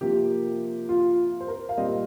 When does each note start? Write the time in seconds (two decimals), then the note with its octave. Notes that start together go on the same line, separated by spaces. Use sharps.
0.01 C3 F3 A#3 G4
0.89 F4
1.40 C5
1.48 A#4
1.69 F5
1.77 A#2 G3 C4 D#5